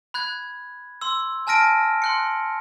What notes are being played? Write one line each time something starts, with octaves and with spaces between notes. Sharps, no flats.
B5 F#6 G#6
C6 E6
G#5 A5 F6 A#6 D7 D#7
C6 F#6 C#7